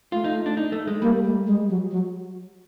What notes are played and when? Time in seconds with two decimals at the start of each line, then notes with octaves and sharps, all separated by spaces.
0.12 A3 F4
0.24 D#4
0.46 D4
0.57 D#4
0.72 A3
0.87 G#3
1.02 G3 A#3
1.24 A3
1.47 G#3
1.69 F#3
1.91 F#3